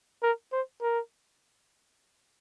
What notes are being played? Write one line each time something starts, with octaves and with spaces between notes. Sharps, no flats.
A#4
C5
A#4